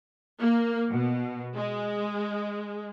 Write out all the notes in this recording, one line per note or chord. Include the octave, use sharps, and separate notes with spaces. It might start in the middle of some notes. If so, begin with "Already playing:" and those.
A#3
B2
G#3